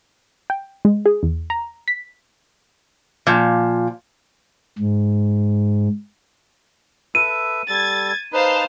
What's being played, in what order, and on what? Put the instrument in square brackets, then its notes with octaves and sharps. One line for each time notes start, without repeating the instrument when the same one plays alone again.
[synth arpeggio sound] G5
G#3
G#4
E2
A#5
B6
[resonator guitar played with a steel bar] A#2 F3
[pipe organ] G#2
[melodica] A4 B4 E5 [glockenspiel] D#7
[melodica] G3 A4 [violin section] G#6 A6
[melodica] D#4 B4 [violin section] C5 F5 A5